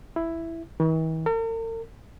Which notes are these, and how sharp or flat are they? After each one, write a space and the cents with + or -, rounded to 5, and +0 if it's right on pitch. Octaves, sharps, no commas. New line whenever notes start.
E4 +5
E3 -45
A#4 -45